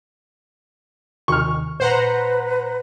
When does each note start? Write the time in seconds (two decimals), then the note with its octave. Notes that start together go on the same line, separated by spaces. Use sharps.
1.28 D#2 C3 D#3 C#6 F6
1.80 A#2 B4 C5 F#5 A#5